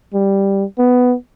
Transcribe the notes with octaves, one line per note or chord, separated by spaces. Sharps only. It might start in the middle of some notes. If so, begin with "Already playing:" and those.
G3
B3